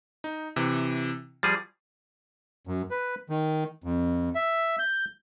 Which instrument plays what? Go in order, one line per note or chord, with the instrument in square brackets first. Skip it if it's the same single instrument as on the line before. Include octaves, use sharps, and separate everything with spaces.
[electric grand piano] D#4
C3 E3
[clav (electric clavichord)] F3 G3 G#4 [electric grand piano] A6
[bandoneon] F#2
B4
D#3
F2
E5
G6